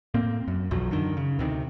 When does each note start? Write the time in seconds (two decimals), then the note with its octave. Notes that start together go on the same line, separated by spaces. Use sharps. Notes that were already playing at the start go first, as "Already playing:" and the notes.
0.14 A2 A#3 C4
0.48 F#2
0.71 B1 E2 F3 F#3
0.91 F#2 D3 D#3
1.17 C#3
1.39 D2 C3 D#3